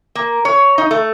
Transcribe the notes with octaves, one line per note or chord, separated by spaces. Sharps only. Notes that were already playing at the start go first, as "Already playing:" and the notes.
A#3
C#5
D#4
A3